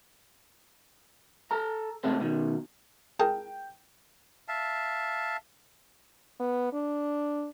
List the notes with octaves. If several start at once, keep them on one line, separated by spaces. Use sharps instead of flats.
A4 A#5
C3 G#3 A3 B3 C4
B2 D#3
G#4 A#4 G5 A5
E5 F5 A5
B3
D4